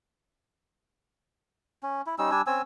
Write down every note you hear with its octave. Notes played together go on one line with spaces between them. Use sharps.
C#4
E4
G3 C#4 D#4 E6
G3 D4 G#5 E6
C4 C#4 G#5 E6